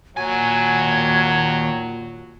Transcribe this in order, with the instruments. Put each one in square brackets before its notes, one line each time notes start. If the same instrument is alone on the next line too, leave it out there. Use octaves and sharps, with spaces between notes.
[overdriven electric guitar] D#2 G#5 [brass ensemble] A#2 F#4 [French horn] F#3 [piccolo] G#6